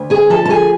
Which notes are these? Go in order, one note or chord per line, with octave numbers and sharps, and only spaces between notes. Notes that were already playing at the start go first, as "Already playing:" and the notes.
Already playing: D2
G#4 G#5
F3 A4 A5
A5
G#4 G#5